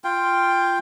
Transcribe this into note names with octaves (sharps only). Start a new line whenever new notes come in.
F4 G5